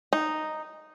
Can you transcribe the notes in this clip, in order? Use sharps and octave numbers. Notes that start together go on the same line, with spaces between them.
D#4